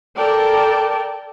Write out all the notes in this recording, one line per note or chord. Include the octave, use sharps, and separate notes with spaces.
A4 A#4 D5 G5 A5